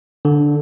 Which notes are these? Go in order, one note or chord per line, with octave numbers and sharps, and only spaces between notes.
D3